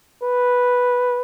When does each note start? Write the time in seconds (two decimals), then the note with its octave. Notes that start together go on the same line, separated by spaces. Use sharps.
0.23 B4